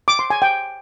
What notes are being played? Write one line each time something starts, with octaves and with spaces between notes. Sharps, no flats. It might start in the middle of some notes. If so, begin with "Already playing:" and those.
D6
C6
G#5
G5